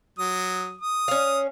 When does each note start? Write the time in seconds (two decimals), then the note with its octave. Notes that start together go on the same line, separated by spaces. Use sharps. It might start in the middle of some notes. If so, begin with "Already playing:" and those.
0.19 F#3 D#6
0.81 D#6
1.08 C#4 F5